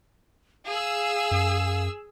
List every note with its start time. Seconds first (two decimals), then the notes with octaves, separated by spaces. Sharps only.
0.66 G#4 F5 E6
1.31 F#2